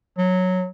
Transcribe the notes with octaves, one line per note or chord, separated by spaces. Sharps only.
F#3